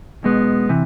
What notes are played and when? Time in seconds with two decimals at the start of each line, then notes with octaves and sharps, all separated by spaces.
0.23 B1 B2 G#3 B3
0.69 C3 E3